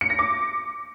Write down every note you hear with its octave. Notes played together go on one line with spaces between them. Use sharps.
C#7
A#6
D6